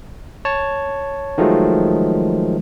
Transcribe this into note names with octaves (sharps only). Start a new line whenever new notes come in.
C#5 A5
D#3 F3 F#3 G#3 A3